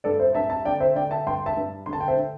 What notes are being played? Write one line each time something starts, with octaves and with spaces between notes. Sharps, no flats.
G2 A4 D5
C5 E5
G2 E5 A5
E5 A5
D3 D5 G5
C5 E5
D3 D5 G5
E5 A5
G2 G5 C6
E5 A5
G2
D3 C6
A5
G5
C5 E5
D3